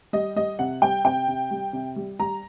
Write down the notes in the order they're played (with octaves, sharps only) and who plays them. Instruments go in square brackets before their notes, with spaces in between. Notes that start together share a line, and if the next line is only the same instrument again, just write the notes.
[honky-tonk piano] G3 D#5
G3 D#5
C3 F#5
G3 G5
C3 G5
C3
G3
C3
G3
G3 A#5